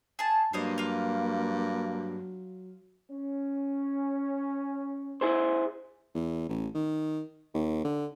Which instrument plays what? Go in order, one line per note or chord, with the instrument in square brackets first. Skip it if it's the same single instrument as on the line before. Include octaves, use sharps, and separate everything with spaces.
[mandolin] G#4 A5
[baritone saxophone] G2 [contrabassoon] F#3 [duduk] A#3 [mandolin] C5 C#5 D#5
[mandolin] F4 F5
[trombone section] C#4
[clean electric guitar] E4 G#4 C5
[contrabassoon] E2
A1
D#3
D#2
D3